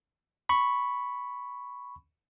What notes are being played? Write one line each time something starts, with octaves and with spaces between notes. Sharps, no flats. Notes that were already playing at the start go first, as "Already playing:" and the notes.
B5 C#6